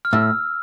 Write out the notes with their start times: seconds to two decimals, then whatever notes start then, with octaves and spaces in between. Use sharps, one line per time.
0.05 F6
0.13 A2 E6